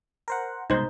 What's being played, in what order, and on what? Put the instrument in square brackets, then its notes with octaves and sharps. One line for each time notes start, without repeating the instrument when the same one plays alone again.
[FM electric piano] A#4 C5 F#5
[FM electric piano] C2 G#2 B2 [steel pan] D#4 C5